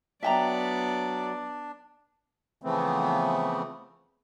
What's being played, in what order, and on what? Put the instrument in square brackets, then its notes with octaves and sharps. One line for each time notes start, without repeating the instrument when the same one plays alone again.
[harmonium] F#3 [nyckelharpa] B3 D5 [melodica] D4 [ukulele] E5 G5 A#5
[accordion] C#3 E3 F3 A3 B3 C4